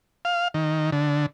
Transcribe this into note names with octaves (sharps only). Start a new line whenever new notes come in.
F5
D#3
D3